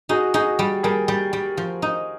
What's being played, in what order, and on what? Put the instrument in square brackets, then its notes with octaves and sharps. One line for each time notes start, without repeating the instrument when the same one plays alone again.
[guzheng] D#4 [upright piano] F#4 G#4
[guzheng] D#4 [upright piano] F#4 G#4
[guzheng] G3
[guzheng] G3 [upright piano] G#4 A#4
[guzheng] G3
G3
F3
D#4